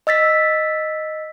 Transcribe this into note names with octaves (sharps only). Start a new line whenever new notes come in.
D#5 E6 A6 B6